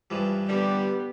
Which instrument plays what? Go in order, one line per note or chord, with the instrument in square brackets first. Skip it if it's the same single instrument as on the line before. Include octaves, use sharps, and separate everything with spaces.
[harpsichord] G2 E3 F3 [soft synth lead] B4
[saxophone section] D3 G3 [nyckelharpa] B3 G4